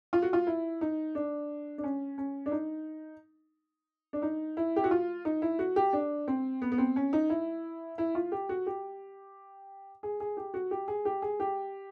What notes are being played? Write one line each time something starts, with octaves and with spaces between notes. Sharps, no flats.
F4
F#4
F4
E4
D#4
D4
D4
C#4
C#4
D4
D#4
D4
D#4
E4
G4
F#4
F4
D#4
E4
F#4
G4
D4
C4
B3
B3
C4
C#4
D#4
E4
E4
F4
G4
F#4
G4
G#4
G#4
G4
F#4
G4
G#4
G4
G#4
G4